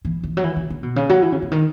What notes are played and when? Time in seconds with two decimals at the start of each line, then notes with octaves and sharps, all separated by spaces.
0.05 E3
0.23 E3
0.37 F#3
0.43 E3
0.56 C#3
0.70 C#3
0.83 B2
0.96 C#3
1.09 F#3
1.22 E3
1.32 C#3
1.42 C#3
1.51 D#3